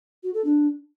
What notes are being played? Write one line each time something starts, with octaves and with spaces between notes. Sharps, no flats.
F#4
A4
D4